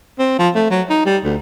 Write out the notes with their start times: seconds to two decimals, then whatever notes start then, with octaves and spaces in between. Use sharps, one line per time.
0.19 C4
0.39 F3
0.55 A3
0.70 F#3
0.90 D#4
1.05 G3
1.24 D2